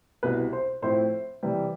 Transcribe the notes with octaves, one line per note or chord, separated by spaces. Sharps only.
C2 B2 B3 E4 B4
C5
A2 F3 C4 E4 C5
C3 E3 G3